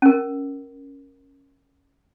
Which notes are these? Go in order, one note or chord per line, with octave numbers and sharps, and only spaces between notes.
C#4 A#4